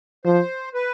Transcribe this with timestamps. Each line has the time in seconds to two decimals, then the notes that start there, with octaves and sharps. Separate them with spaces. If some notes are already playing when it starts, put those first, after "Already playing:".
0.25 F3 C5
0.74 B4